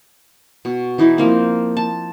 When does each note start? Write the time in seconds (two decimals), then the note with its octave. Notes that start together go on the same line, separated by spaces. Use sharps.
0.65 B2
0.98 E3 D#4 E4
1.18 F3 A#3 C4
1.77 A5